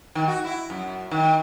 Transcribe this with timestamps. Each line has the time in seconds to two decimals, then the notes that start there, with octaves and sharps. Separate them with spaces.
0.15 D#3
0.28 F#4
0.45 E4
0.70 F#2
1.11 D#3